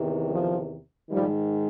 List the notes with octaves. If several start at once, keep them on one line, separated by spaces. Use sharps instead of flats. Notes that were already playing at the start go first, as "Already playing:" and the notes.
Already playing: E2 C3 D#3
F3
G#2 D#3 F3 G3